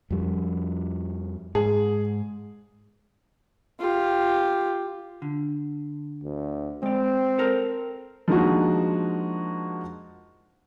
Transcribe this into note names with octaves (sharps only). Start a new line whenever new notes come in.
F2 F3 G3
G#2 G#4
F4 G4
D3
D2
G#3 C4 D5
A4 A#4 C5
F3 G#3 A#3 D4 D#4 F#4